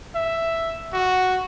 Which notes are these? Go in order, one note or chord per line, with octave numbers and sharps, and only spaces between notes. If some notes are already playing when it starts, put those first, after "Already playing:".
E5
F#4